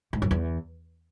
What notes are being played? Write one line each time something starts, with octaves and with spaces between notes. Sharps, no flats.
G#2
F#2
E2